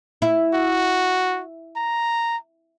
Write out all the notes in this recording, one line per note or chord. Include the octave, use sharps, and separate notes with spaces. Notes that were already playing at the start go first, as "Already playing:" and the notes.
E4
F#4
A#5